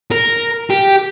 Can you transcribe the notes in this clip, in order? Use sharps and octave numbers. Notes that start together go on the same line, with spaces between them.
A#4
G4